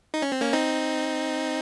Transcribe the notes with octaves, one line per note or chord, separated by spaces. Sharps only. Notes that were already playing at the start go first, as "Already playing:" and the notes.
D#4
C#4
C4
A#3 C#4
C4 D#4